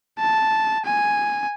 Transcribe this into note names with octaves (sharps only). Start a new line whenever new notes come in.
A5
G#5